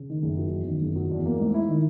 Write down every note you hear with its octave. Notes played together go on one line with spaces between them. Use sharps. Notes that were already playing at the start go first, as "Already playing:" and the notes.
Already playing: C#3
D#3
F#1
F#3
E2
D#3
F#1
F#3
E2
A#3
G#2
E4
D#3